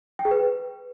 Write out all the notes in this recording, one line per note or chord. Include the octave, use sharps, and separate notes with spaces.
G5
G#4
B4